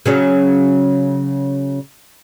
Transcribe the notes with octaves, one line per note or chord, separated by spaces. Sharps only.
C#3 F#3 C#4